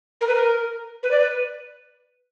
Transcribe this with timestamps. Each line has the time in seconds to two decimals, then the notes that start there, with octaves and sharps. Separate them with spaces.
0.21 A#4
0.27 B4
0.35 A#4
1.03 B4
1.11 D5
1.20 B4